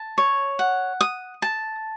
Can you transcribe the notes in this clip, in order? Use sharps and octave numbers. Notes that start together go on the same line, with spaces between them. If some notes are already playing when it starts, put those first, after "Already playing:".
Already playing: A5
C#5
F#5
D#6
A5